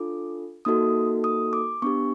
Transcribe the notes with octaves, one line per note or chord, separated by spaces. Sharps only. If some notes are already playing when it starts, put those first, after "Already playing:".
Already playing: D4 F4 A4 D6
A#3 D#4 F#4 A4 D#6
D#6
D6
B3 D4 G4 C#6